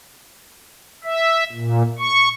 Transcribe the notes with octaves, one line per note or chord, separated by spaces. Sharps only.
E5
A#2
C#6